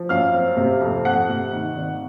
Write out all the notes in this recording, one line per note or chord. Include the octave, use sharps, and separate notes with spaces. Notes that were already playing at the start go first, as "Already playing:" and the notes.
Already playing: F3
F#2 F5 F6
C4
C3
F2
F2 F#5 F#6
C3
D#3
G#1